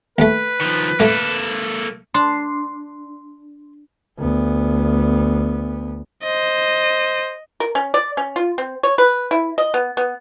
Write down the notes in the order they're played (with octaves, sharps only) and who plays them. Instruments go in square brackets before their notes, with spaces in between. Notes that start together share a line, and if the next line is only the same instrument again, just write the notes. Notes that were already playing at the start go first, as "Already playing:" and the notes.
[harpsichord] D#2 A3 [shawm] B4
[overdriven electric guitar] D#3 F3
[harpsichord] A2 A3 [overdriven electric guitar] A#3 A4
[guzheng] D4 [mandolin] C6
[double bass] D2 B3
[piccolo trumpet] C5 [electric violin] D#5
[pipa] A#4
C#4
D5
C#4
F4
C4
C#5
B4
E4
D#5
B3
B3